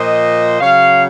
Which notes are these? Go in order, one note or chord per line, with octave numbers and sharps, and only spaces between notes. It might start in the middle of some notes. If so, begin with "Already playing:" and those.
Already playing: A#2 F3 C5 D#5
C#3 F#3 C#5 F5